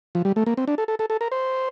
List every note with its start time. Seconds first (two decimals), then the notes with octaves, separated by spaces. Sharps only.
0.15 F3
0.25 G3
0.36 A3
0.46 A#3
0.57 C4
0.68 D4
0.78 A4
0.88 A4
0.99 A4
1.10 A4
1.21 A#4
1.32 C5